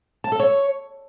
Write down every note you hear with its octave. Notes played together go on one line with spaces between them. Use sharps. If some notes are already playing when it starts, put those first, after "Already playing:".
A5
A4
C#5